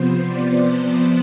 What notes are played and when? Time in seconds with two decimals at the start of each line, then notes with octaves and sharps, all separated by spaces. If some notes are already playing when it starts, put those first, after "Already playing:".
Already playing: C3 F3 B3 C5
0.25 D5